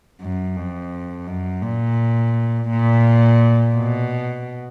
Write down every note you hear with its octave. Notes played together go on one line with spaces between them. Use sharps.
F#2
F2
F#2
A#2
A#2
B2